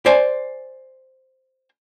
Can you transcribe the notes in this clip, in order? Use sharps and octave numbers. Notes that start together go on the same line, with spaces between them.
C5 D5 G#5